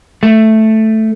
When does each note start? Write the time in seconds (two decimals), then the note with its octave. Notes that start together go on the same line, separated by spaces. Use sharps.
0.23 A3